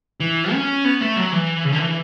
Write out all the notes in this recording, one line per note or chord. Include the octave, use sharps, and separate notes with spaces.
E3
C#4
B3
A3
F#3
E3
C#3
D3
E3